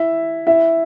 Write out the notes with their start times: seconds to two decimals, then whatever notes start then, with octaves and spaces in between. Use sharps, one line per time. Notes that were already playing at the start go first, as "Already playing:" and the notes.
Already playing: E4 E5
0.47 E4 E5